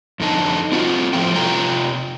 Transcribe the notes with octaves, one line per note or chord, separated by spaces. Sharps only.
F2 D3 D#4 A5
C4 F4 F#4
F2 A2 F3 A3 G5
C3 F4 G5 A#5